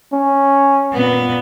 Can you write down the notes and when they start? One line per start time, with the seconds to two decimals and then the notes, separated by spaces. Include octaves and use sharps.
0.13 C#4
0.94 A#2 B3